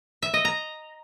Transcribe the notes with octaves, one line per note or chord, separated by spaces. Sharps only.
E5
D#5
A#5